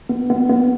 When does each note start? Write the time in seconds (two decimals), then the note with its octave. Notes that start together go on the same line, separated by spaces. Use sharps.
0.09 B3
0.30 B3
0.50 B3